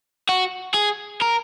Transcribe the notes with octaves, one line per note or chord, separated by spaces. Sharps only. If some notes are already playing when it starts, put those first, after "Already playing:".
F#4
G#4
A#4